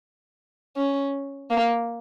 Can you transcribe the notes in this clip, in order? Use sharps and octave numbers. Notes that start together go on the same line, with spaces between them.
C#4
A#3